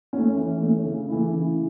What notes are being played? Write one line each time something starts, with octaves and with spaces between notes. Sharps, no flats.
A3 C#4
E3
A3 C#4
C#3
E3 A3 E4
C#3